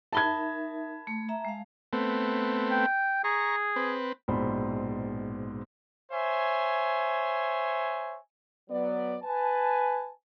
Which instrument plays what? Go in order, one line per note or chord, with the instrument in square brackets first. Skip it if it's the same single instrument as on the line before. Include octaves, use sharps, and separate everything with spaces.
[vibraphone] D#4 A#4 E5 [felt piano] A5 B5 G#6
[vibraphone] A3
E5 A#5
G#3 F5
[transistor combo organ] A3 B3 C4
[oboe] G5
[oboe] G#4 [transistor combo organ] A#5 C#6
[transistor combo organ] C4 B4
[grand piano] A#1 G#2 B2 C5 B5
[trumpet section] C5 C#5 E5 G#5
[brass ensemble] F#3 B3 D5
B4 G#5 A5